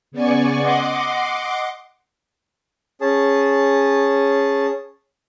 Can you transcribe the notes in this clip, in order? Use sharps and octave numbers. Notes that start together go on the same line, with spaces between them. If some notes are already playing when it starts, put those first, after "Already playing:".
C#3 B3 D5 G#5 C#6
D#5 F#5 C6 D6
C#4 G#4 A5